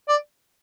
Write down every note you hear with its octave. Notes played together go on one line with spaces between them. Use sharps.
D5